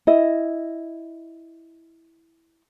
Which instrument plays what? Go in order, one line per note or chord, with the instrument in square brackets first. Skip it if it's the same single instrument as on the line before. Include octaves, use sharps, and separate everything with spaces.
[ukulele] E4 D#5